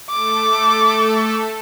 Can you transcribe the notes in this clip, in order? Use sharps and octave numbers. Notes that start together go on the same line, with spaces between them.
A3 A4 D6